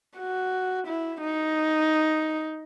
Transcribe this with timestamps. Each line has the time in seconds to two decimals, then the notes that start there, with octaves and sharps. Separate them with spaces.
0.19 F#4
0.87 E4
1.21 D#4